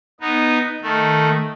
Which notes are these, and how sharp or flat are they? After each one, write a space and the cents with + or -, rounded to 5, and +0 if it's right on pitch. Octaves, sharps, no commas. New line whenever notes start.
B3 +0 D#4 -5
D#3 -5 A3 +0